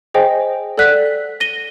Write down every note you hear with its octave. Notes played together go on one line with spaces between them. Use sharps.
G#4 C5 D#5 G5 G#5
A4 D5 F#5 F#6 B6
A#6 D#7 G7